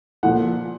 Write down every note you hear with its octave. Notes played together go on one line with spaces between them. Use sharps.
A#2 F3 F#5